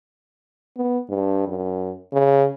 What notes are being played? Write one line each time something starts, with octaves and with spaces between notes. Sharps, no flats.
B3
G2
F#2
C#3